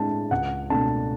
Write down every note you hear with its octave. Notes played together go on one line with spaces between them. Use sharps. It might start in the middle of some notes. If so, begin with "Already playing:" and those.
Already playing: A2 G#3 D4 A5
C#2 F#5
B2 A3 D4 A5